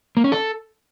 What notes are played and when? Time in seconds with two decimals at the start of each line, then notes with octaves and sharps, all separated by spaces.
0.17 A#3
0.24 C#4
0.32 A4